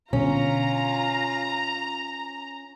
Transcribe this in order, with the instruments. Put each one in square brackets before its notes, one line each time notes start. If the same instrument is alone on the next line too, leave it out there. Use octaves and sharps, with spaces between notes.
[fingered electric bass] B2 D3 [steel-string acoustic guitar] C#4 [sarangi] F4 [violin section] A#5